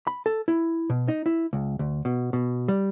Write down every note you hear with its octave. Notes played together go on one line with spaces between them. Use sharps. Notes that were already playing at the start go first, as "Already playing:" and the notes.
B5
A4
E4
B2
D#4
E4
C#2
D2
B2
B2
G3